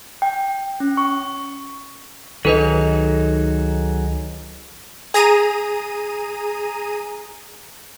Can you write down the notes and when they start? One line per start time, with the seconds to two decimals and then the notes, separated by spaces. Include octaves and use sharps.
0.22 G5
0.80 C#4
0.97 C#6
2.45 C#2 D#3 F#3 D#4 G#4 A4 B4 D#5
5.14 G#4 A#5 D#7